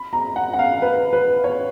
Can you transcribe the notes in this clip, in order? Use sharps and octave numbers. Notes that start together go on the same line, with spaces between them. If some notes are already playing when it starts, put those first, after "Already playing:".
Already playing: B5
A#5
F#5
F#5
F5
B4
B4
C#5